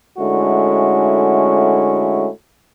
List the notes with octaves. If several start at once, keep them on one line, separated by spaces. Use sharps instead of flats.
D3 G#3 A3 C#4 E4 F#4